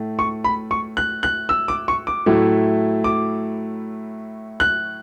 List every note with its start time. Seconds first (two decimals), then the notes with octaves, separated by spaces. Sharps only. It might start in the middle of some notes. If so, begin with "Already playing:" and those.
Already playing: A2 A3
0.19 C#6
0.44 B5
0.71 C#6
0.97 F#6
1.23 F#6
1.49 E6
1.68 D6
1.88 C#6
2.07 D6
2.26 A2 F#3 A3 E4
3.04 D6
4.60 F#6